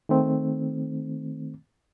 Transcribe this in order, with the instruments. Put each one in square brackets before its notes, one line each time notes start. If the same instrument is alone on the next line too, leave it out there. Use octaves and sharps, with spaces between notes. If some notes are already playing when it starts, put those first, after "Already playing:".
[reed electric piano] D#3 A3 C4